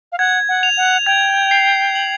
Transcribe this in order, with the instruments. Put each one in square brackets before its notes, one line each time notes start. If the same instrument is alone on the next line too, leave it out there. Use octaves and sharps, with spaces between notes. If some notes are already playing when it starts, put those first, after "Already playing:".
[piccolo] F5
[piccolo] F#5 [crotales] G#6
[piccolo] F#5
[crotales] F7
[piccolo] F#5
[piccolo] G5 [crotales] G#6
[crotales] C7
F#7